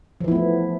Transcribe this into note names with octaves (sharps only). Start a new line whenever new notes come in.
E3 F3 A3 B3 E4